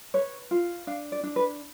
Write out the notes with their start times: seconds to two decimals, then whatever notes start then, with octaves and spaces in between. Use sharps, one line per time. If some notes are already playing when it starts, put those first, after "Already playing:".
0.14 B4 C#5
0.51 F4
0.87 D4 F5
1.12 D5
1.23 D4
1.36 B4